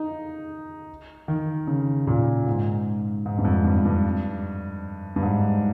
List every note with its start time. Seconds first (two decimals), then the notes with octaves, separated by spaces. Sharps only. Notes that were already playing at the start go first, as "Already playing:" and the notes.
Already playing: D#4
1.28 D#3
1.68 C#3
2.07 A#2
2.46 G#2
3.26 G#2
3.38 G2
3.45 F2
3.64 G2
3.85 G2
5.16 G2
5.23 G#2